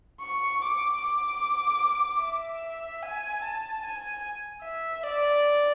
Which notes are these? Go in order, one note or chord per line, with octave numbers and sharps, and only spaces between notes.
C#6
D6
D6
E5
G#5
A5
G#5
E5
D5